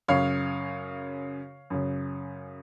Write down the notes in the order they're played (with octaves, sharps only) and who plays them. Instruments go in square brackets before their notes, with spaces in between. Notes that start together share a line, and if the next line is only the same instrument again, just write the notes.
[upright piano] F#2 C#3 C#5 F5
F#2 C#3